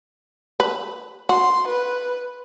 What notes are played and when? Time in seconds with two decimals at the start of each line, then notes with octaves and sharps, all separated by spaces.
0.60 B4
1.29 F#4 C6
1.68 B4